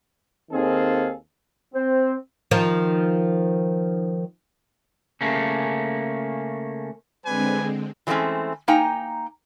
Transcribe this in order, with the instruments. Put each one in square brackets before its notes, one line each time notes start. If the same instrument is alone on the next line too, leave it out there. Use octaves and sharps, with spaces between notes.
[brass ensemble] D#2 D#3 C4 G#4 A4 F5
[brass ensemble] C4 [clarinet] C5
[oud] D#3 F3
[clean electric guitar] C#3 A3 A#3 C#4
[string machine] D3 G#3 C4 [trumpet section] G3 B4 G#5
[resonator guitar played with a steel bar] E3 F#3 G#3 A3 C4 C#4
A#3 D#4 G5 G#5 A#5